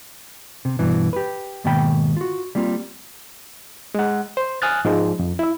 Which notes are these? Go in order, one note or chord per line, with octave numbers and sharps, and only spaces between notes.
C3
G2 B2 E3
G4 B4
G#2 B2 D#3 A#3 G5 B5
F4 F#4
G3 A#3 C4 F4
G#3 F#5
C5
G#5 D#6 F6 F#6 A6
G#2 F3 G#3
F2
E4 E5